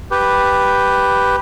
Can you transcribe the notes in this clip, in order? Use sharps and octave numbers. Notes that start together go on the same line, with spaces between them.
G4 B4